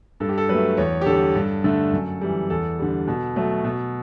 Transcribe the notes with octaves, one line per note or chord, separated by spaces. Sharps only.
G2 A4
G4
A4
F#3 A3 B4
E2 C#5
G4
D3 G3 A4
G2
D3 A3
F#2
E3 G3
E2 A4
D3 G3
B2
F#3 A3
B2